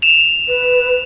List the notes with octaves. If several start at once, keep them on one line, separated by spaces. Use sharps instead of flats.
E7 F7
B4